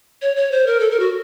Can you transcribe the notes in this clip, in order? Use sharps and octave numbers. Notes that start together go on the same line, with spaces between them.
C#5
C#5
C5
A#4
A4
A#4
F#4